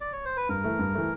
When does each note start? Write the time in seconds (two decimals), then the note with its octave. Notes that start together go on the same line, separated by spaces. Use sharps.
0.01 D5
0.13 C#5
0.25 C5
0.37 B4
0.49 G2 A#4
0.64 E3 A3
0.79 G2
0.95 E3 A3